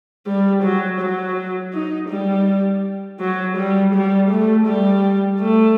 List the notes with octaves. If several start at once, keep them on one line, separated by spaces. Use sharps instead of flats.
G3
F#3
F#3
D#4
G3
F#3
G3
G3
A3
G3
A3